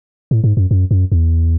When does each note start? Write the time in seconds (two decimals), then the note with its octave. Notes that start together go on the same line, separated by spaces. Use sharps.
0.31 A2
0.44 G#2
0.57 F#2
0.71 F#2
0.91 F#2
1.12 E2